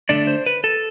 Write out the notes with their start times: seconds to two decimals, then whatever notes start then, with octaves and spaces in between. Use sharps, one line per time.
0.09 D3 A3 D4 D5
0.27 C5
0.46 B4
0.64 A4